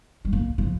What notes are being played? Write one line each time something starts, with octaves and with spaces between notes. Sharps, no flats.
G#3
A#3
F3